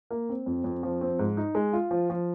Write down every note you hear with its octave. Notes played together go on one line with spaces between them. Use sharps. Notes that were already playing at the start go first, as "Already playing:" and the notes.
A#3
C4
F2
F2
F3
C4
G#2
D#4
G#3
F4
F3
F3